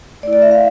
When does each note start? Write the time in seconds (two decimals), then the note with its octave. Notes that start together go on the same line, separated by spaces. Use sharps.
0.23 A3 D5
0.27 E4
0.33 D5
0.42 E5
0.51 F5